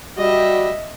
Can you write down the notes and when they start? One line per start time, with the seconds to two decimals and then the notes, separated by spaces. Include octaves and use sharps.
0.18 G3 F#4 D#5 E5